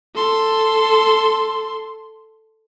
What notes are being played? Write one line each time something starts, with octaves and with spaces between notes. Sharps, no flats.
A4 C6